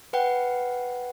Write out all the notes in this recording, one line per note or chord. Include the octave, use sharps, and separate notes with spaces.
B4 F#5 G5